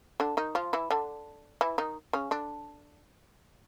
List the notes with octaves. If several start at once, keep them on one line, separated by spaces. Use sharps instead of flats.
D3 D4
D#3 D#4
F3 F4
E3 E4
D3 D4
E3 E4
D#3 D#4
C#3 C#4
D3 D4